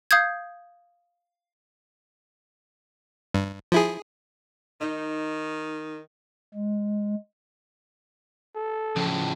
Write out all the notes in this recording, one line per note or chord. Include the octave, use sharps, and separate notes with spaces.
F5 D#6 G6 G#6
G2
F3 E4 G#4
D#3 D#4 D#5
G#3
A4
A2 C#3 F3